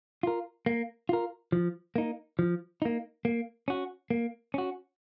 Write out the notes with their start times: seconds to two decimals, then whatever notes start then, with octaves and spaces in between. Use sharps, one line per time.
0.23 F4 A#4
0.66 A#3
1.09 F4 A#4
1.52 F3
1.96 A#3 D#4
2.39 F3
2.82 A#3 D#4
3.25 A#3
3.68 C#4 F#4
4.10 A#3
4.54 C#4 F#4